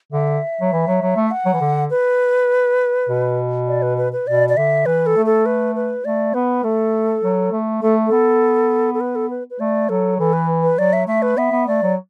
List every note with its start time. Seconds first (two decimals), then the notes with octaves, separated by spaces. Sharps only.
0.12 D3 E5
0.61 F#3
0.72 E3
0.87 F#3
1.02 F#3
1.16 A3
1.26 E5
1.31 F#5
1.46 F#3
1.53 E3
1.61 D3
1.90 B4
3.09 B2
3.68 D5
3.82 B4
3.98 B4
4.13 B4
4.27 B2 D5
4.49 D5
4.57 D3 E5
4.86 E3 B4
5.06 A4
5.16 A3
5.26 A4
5.46 B4
5.75 B4
6.05 A3 D5
6.34 B3 B4
6.64 A3 A4
7.24 F#3
7.52 A3
7.82 A3 A4
8.07 B3 A4
8.94 A4
9.00 B4
9.16 A4
9.30 B4
9.51 B4
9.60 A3 D5
9.89 F#3 A4
10.19 E3 A4
10.33 B4
10.63 B4
10.78 F#3 D5
10.93 E5
11.07 A3 E5
11.22 B4
11.37 B3 E5
11.52 B3
11.67 A3 D5
11.82 F#3